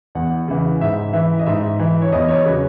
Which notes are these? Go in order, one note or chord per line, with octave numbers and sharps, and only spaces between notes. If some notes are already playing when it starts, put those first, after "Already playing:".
E2 F#5
C#3 E3
G#2 E5
E3 E5
D#5
G#2 E5
E3
C#5
E2 D#5
C#5
C#3 F#3 B4